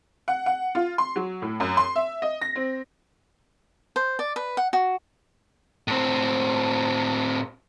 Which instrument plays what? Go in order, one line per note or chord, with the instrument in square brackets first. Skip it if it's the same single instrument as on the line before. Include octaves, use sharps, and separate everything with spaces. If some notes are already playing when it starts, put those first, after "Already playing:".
[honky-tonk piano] F#5
F#5
F4
C6
F#3
A2
F#2
C6
E5
D#5
A#6
C4
[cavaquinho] C5
D5
B4
F#5
F#4
[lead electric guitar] A2 C4